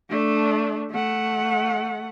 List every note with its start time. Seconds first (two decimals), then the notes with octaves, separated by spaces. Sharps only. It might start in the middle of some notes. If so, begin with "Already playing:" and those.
0.10 A3 D4
0.91 A3 F#5